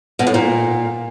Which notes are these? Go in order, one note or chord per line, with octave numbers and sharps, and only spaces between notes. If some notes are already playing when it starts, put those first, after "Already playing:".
B2
A2
A#2